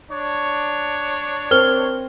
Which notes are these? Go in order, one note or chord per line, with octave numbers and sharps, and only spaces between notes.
D4 C#5
C4 A#4 F6 G7